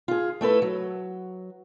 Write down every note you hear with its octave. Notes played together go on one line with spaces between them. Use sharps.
F4 G#4
A3 E4 A4 B4
F#3